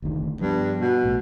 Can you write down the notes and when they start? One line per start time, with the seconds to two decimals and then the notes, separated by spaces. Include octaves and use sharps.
0.02 F1 D2 D#3
0.41 G2 F3 B3
0.81 B2
1.04 A#1 A2